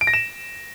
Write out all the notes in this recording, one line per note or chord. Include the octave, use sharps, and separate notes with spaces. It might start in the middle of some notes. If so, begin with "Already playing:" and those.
D7
A#6
E7